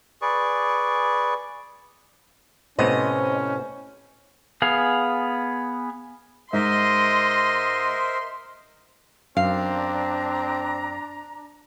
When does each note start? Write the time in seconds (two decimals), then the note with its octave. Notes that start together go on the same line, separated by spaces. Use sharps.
0.22 G#4 B4 D5 C#6
2.79 A2 C3 B3 C#4 C5 D#5
4.62 B3 G#4 F5
6.53 G#2 A#4 C5 D#5 E5 C6
9.37 F#2 C4 D4 F5 A#5